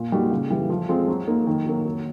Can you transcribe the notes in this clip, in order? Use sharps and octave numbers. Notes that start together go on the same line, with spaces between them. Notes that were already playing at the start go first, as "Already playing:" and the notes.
Already playing: A#2
G3 A#3 D#4 F#4
C#3
E3 G3
F3
G#3 C4 F4
F#3
A#3 D#4
D#3
F#3 A#3
F#3